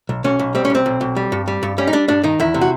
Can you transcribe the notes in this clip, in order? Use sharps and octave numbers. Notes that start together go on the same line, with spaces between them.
B1
B1 C#4
B1
G3 C4
C#4
B1 C4
B1
B1
G3
G2
G3
G2
G3 C#4
D#4
G3 D4
G2 D4
D#3 D#4
E2 E4
C3
F#4